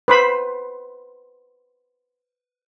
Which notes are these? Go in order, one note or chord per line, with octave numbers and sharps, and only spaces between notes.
B4 C5 B5